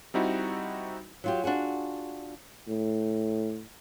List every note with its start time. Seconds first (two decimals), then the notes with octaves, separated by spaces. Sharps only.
0.14 G3 C4 D#4 E4 F#4
1.24 F#3 F4 G4
1.44 D4 F4 F#4 G#4
2.68 A2